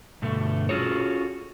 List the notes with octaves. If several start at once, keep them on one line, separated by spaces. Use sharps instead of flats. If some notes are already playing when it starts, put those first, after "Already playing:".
G2 B2 D3 A3
C#4 F4 F#4 G#4 A4 C#5